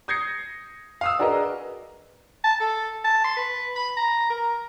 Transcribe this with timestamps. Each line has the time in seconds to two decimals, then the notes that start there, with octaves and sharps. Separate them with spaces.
0.08 D#6 G6 G#6 A#6 C7 C#7
1.01 F5 D#6 E6
1.19 D4 F#4 G#4 A#4 B4 D#5
2.44 A5
2.60 A4
3.05 A5
3.24 C6
3.37 B4
3.76 B5
3.97 A#5
4.30 A#4